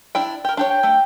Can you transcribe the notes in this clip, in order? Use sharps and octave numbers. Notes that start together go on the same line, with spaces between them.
D4 E4 G5
G4 A#4
D4 G4 C#5
G5
A3